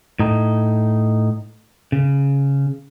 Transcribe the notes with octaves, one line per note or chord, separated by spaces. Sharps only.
A2 D#4
C#3